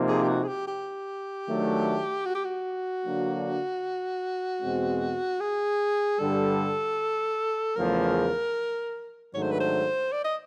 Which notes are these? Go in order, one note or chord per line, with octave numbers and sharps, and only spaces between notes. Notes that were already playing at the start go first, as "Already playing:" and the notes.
Already playing: C3 F3 A#3 D#4
G#4
G4
F#4
G#4
G4
G4
D#3 F#3 A3 D4
F#4
G4
F#4
D3 F#3 A#3 D4
E2 B2 G#3 C4
G#4
G2 D3 G3 A4
E2 C#3 F3 A3 A#4
G#2 D#3 F#3 A3 D4 C#5
C5
B4
C5
D5
D#5